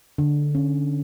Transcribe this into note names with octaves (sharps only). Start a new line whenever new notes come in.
D3
C#4